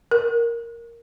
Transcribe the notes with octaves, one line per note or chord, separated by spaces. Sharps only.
A#4